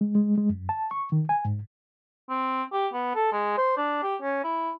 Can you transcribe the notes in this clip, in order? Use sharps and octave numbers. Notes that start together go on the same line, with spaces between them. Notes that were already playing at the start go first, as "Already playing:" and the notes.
G#3
G#3
G#3
F#2
A5
C#6
D#3
G#5
G#2
C4
G4
B3
A4
G#3
C5
D4
G4
C#4
E4